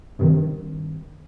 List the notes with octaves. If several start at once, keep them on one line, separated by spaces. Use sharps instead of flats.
G2 C3 D#3